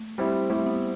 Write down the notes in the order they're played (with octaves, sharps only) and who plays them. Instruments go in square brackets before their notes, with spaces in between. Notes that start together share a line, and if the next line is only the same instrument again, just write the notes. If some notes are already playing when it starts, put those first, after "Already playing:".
Already playing: [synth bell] A3
[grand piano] G3 C4 E4
[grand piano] G3 C4 E4 [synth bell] A3
[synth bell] B3